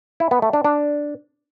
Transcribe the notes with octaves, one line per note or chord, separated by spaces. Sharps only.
E4
B3
A3
D4
D4